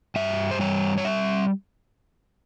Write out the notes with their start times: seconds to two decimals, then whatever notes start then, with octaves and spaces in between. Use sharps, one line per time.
0.16 G2 E5
0.51 C5
0.60 G3 C#5
0.98 C#5
1.05 E5